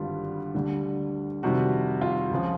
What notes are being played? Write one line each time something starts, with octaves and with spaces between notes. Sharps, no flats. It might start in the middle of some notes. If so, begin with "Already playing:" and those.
Already playing: G#1 G2 D3 G3 F4
D2 D3 G3
F2 C3 D#3 G3 F#4
F4
C#2 C#3 F3